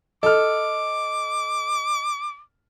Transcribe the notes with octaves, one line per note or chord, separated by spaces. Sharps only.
A4 D#5 D6 F6